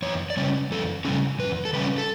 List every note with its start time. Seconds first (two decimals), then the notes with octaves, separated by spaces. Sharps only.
0.02 E2 C#5
0.30 D5
0.37 C#3 G3 C#4 C#5
0.71 E2 A4
1.05 C#3 G3 C#4 A4
1.39 E2 B4
1.65 A4
1.73 C#3 G3 C#4 B4
1.98 A4